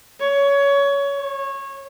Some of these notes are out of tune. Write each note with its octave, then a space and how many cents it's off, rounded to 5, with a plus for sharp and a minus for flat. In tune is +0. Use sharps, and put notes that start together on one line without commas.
C#5 +20
C#5 -20